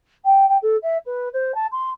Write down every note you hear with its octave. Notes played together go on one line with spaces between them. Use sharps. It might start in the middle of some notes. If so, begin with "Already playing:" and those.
G5
G5
A4
E5
B4
C5
A5
C6